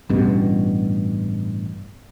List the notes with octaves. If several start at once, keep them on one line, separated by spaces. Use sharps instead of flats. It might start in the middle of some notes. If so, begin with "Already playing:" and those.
A1 G2 B2